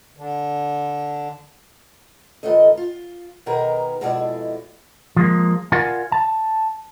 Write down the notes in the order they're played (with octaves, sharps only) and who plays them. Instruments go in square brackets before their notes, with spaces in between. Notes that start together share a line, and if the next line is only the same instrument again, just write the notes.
[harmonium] D3
[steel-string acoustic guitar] G2 D#3 F3 A3 D#5
F4
B2 D#3 G#4 A#4 B4
F2 B2 G#3 E4 G#4 D5
[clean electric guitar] F3 G#3 A#3
F4 A#4 D5 F5 F#5 G#5
A5